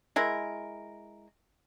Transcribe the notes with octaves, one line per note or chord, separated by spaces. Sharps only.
G#3 E4 A#4